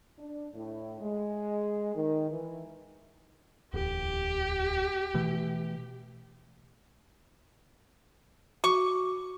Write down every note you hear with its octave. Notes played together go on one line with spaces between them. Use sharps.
D4
A2
G#3
D#3
E3
D1 E2 G4
B2 E3 A3
F#4 C#6 D6